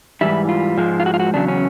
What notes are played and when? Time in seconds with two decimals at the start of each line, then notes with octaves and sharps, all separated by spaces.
0.21 G#2 E3 G3 E4
0.49 F4
0.77 G#2 F3 G#3
1.00 F4
1.06 F#4
1.14 F4
1.20 F#4
1.34 E2 C#3 F#3 D4
1.48 C#4